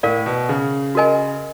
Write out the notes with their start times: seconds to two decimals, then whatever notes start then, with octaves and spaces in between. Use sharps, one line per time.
0.03 A2 A#4 D5 F5
0.26 B2
0.49 C#3
0.95 F#4 A#4 D#5 G#5